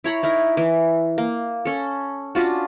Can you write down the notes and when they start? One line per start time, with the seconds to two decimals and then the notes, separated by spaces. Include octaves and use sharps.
0.04 E4 C#5 A#5 B5
0.23 D#4 E4 A#4
0.57 E3
1.18 A#3
1.65 C#4 A4
2.35 C#4 D4 F4 F#4